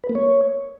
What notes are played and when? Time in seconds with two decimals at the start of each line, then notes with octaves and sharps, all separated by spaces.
0.04 B4
0.09 A#3
0.15 C#5